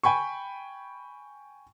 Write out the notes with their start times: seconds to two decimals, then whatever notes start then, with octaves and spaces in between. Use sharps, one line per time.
0.03 G5 G#5 B5 C#6